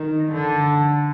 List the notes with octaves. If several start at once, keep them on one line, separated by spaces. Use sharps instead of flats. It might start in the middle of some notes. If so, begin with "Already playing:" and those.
Already playing: D#3
D3